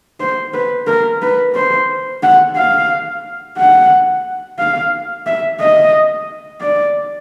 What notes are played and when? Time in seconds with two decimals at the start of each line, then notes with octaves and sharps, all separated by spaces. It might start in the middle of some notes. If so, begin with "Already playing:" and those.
0.20 C5
0.54 B4
0.87 A#4
1.22 B4
1.55 C5
2.23 F#5
2.56 F5
3.57 F#5
4.59 F5
5.26 E5
5.60 D#5
6.61 D5